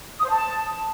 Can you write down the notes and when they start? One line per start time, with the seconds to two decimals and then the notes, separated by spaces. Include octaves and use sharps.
0.19 D#6
0.24 C5
0.29 A5